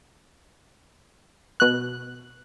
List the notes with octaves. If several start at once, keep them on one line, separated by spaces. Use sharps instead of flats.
B2 F#6